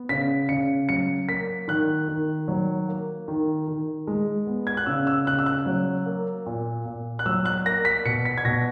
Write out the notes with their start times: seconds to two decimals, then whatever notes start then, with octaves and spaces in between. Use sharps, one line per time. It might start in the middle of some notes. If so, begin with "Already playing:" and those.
Already playing: B3
0.09 C#3 B6
0.49 C#3 C#7
0.89 F#3 C#7
1.29 A#3 B6
1.68 D#3 F#6
2.08 D#3
2.48 F#3
2.88 A#3
3.28 D#3
3.68 D#3
4.07 G#3
4.47 B3
4.67 G#6
4.77 F#6
4.86 C#3 E6
5.07 E6
5.27 C#3 F#6
5.39 E6
5.46 F#6
5.66 F#3
6.06 A#3
6.46 A#2
6.86 A#2
7.19 F#6
7.26 F#3 E6
7.45 F#6
7.66 A#3 A#6
7.85 B6
8.05 B2 C#7
8.25 B6
8.38 G#6
8.45 B2 A#6